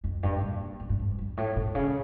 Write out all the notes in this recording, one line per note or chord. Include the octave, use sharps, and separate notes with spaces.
F2
G2
A#2
E2
G2
F2
G2
A2
A#2
C#3